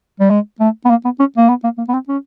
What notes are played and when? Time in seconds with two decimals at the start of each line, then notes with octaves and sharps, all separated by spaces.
0.20 G3
0.30 G#3
0.59 A3
0.85 B3
0.90 A#3
1.04 B3
1.19 C#4
1.37 A#3
1.49 B3
1.64 A#3
1.78 A#3
1.88 B3
1.93 C4
2.08 C#4